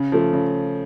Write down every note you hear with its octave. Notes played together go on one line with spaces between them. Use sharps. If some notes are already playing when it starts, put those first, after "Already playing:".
Already playing: C#3
F3 A3
C#3